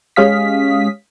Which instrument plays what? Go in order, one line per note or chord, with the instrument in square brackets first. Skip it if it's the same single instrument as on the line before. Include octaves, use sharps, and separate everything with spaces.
[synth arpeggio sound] G#3 C#4 G4 F5 D#6 B6